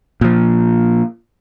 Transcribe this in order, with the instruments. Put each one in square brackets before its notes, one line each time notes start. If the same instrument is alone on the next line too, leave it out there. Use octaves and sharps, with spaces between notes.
[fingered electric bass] A#2 F3